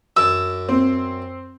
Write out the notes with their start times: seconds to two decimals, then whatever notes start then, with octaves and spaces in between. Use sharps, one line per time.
0.16 F#2 D4 E6
0.69 C4